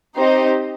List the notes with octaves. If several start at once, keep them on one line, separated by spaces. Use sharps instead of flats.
C4 D#4 G4 C5 D#5